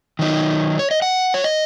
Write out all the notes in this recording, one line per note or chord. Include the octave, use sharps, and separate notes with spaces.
D#3 F#3 D#4
C#5
D#5
F#5
C#5
D#5